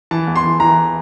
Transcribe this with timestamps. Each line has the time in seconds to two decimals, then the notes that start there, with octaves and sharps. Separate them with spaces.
0.11 E3 A5
0.27 E2
0.36 C6
0.44 E3
0.60 E3 A#5